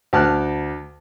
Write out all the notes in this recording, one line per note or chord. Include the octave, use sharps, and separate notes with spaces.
D2 A5 F6 F#6